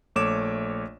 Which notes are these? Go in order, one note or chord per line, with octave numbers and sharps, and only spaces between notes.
A#1 A3 C#5 D6 E7